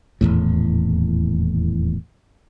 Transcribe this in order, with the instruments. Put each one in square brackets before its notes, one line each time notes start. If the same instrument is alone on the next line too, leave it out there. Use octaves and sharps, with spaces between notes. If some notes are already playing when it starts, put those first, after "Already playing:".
[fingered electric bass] D#1 G#1 E2 A2